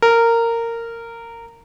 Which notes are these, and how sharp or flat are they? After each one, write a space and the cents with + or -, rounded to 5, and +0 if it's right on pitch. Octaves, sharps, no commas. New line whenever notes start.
A#4 -15